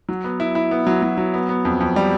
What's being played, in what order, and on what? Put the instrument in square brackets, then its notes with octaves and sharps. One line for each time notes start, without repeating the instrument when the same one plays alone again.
[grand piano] F#3
B3
E4
E4
B3
F#3
F#3
F#3
B3
B3
F2
F2
G3